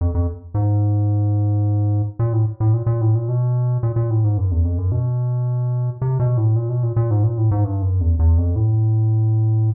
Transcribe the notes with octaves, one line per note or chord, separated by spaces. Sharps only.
F2
F2
G#2
A#2
A2
A2
A#2
A#2
A2
A#2
B2
A#2
A#2
A2
G#2
F#2
E2
F2
F#2
B2
C3
B2
A2
A#2
B2
A#2
A#2
G#2
A#2
A2
G#2
G2
F#2
E2
E2
F2
A2